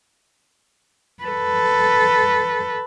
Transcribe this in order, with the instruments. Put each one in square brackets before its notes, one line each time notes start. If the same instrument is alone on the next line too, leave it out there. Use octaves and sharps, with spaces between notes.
[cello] A4 B4